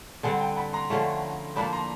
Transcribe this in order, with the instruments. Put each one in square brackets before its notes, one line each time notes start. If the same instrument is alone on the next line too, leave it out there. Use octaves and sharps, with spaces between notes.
[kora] D3 G3 C4 [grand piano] F#5 G#5
[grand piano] G5 A5
A5 B5
A#5 C6
[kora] D3 F3 A3 C#4
[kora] F3 A#3 D4 G4 [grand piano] A5 B5
[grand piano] A#5 C6